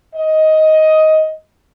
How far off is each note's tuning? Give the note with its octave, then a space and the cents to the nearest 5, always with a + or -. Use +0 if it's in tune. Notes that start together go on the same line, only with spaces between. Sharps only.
D#5 +10